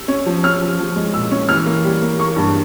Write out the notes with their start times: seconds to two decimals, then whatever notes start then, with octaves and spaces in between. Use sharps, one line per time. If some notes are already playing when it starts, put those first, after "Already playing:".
Already playing: E6
0.08 C#4
0.26 F3
0.43 C#4 F6
0.61 F3
0.79 F3
0.96 G#3
1.14 A#2 E6
1.31 C#4
1.49 E3 F6
1.66 A#3
1.84 G3
2.02 A#3
2.19 A#3 C#6
2.36 G2